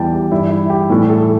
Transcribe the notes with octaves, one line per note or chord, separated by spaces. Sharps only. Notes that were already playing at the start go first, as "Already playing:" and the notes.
Already playing: E2 E3 G3 G5 A5
G4
G2 E3 G3 E4
E4
G4
A2 E3 G3 A4
A4